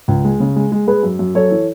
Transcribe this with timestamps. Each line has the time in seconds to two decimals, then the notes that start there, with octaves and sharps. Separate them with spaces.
0.08 C#2
0.24 G#3
0.40 C#3
0.56 G#3
0.72 G#3
0.87 G#3 G#4 B4
1.03 F#2
1.19 F#2
1.35 F#2 A4 C#5
1.51 E3